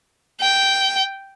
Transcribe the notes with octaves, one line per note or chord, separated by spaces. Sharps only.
G5